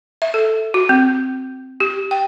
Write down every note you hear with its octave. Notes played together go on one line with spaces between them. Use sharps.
E5
A4
F#4
C4
G4
G5